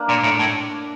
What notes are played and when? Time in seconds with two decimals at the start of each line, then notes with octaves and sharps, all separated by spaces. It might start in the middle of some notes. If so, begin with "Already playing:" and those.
Already playing: A#3 D4
0.09 A#2
0.24 A2
0.39 A2